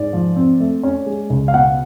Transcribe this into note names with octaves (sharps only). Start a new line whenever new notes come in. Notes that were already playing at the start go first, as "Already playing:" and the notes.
Already playing: G#2 D5
F3
C4
A3
C#4
G#3
C#2
F5
B2 F#5